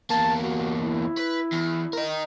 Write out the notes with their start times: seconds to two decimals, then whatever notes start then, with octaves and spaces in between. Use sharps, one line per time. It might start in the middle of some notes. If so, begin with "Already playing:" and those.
0.10 E2 A#3 A5
0.42 F#4
0.83 E4
1.18 B4
1.52 E2
1.93 A#4 D#5